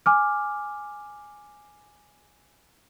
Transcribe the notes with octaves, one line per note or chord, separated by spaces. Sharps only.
G#5 D6 F6